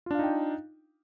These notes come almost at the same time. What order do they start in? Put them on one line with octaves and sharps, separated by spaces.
F4 D4 F5 D#4 G5